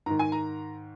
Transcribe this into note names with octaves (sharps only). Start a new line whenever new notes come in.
G#2 D#3 A#5
G#5
A#5